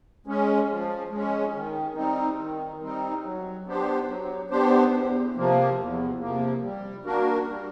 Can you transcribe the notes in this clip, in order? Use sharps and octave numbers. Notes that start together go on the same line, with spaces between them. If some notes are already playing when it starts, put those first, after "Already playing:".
G#3 C#4
F3
G#3 C#4
D#3
G3 C4 D#4
D#3
G3 C4 D#4
F#3
B3 D4 G4 C5
F#3
B3 D4 G4 C5
E2
C3 F3 A#3
E2
C3 F3 A#3
G3
A#3 D4 F#4 A#4
G3